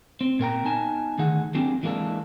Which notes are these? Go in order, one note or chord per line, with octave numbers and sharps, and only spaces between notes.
C4
A#2 A#4 G5 A#5
B3 D#4 G#5 A5
D2 D#3 G#4 F#5
F#3 A#3 C4 D4 G4 G#4
E3 G#3 A#3 D4 A4